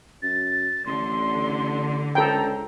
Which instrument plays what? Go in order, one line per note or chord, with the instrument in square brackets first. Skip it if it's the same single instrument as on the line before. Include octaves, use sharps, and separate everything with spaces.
[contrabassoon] F#2 [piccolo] A6
[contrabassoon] A1 [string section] D3 [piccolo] C6
[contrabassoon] C#2 [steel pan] A4 G5 [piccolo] A#5